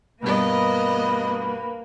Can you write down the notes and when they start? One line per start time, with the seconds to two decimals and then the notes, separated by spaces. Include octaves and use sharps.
0.22 G2 B2 A#3 B3 B4 D#5